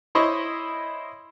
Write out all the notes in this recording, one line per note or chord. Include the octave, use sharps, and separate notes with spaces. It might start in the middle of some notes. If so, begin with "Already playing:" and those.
E4 C5 C#5 D#5 B5 C#6